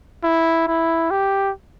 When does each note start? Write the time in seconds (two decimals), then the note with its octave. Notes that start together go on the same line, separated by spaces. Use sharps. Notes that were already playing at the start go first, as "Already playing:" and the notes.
0.24 E4
0.68 E4
1.11 G4